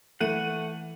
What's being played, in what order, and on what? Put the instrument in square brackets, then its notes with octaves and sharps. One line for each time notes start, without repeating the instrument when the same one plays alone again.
[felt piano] E3 [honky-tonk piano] A3 D#7 [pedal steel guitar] F#5